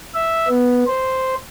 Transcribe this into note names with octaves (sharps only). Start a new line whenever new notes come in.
E5
B3
C5